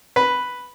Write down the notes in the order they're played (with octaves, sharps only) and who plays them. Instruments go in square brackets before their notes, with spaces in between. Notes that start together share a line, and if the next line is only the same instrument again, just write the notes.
[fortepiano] B4